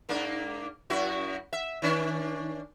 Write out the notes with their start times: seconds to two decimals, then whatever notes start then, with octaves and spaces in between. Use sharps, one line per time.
0.09 G#2 A#3 D4
0.90 F#2 E4 F#4
1.53 E5
1.82 D#3 C#4 D4